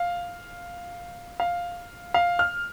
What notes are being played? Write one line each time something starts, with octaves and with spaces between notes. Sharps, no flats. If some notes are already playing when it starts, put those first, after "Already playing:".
Already playing: F5
F5
F5
F6